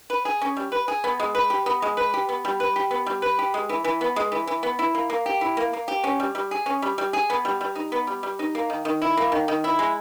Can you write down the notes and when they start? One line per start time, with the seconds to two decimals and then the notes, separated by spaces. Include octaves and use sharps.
0.10 B4
0.25 G#4
0.42 C#4
0.57 G3
0.72 B4
0.88 G#4
1.04 B3
1.20 G#3
1.35 B4
1.50 G4
1.66 B3
1.82 G#3
1.97 B4
2.14 G4
2.29 B3
2.45 G3
2.60 B4
2.76 G4
2.91 B3
3.06 G3
3.22 B4
3.39 G4
3.54 G#3
3.69 E3
3.84 E3
4.01 B3
4.16 G#3
4.32 E3
4.47 E3
4.63 B3
4.79 E4
4.95 A#3
5.10 A#3
5.26 G4
5.41 E4
5.57 A#3
5.73 A#3
5.88 G4
6.04 C#4
6.20 G3
6.35 G3
6.51 G#4
6.66 C#4
6.82 G3
6.98 G3
7.13 G#4
7.30 B3
7.45 G3
7.61 G3
7.75 D#4
7.92 B3
8.07 G3
8.23 G3
8.39 D#4
8.55 A#3
8.70 D#3
8.85 D#3
9.02 E4
9.17 A#3
9.32 D#3
9.48 D#3
9.64 E4
9.79 G#3